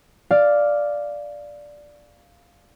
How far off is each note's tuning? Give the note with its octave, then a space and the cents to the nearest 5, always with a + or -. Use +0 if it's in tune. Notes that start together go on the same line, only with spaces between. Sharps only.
D5 +0 F5 +0